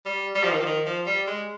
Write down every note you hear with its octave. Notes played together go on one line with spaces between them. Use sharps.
G3
G3
F3
D#3
F3
D#3
F3
G3
G#3